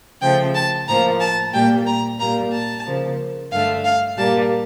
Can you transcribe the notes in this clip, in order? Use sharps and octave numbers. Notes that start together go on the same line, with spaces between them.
C#3 F3 A3 G5
A5
A2 F3 A#3 A#5
A5
A#2 G3 A#3 G5
A#5
A#2 G3 A#3 A#5
A5
C#3 F3 A#3
G2 D3 A3 F5
F5
A#2 G3 A#3 A5